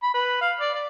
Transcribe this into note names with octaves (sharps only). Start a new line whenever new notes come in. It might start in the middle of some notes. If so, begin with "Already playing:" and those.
B5
B4
F5
D5
D5